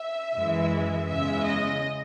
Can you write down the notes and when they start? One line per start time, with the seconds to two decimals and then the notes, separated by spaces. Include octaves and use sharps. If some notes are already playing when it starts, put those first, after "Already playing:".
Already playing: E5
0.35 F#2 E3 G#3
1.08 E2 C#3 G#3 E5
1.45 D#5